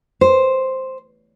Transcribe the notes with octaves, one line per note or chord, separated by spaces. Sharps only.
C5